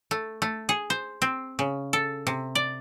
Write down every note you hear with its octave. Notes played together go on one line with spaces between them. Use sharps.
A3
A3
G#4
C5
C4
C#3
A4
C3
D5